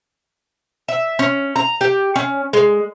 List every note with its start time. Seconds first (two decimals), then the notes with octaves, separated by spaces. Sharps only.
0.88 E5
1.19 C#4
1.56 A#5
1.81 G4
2.16 C#4
2.53 G#3